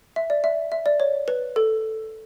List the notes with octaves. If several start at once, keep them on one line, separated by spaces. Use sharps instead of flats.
E5
D5
E5
E5
D5
C#5
B4
A4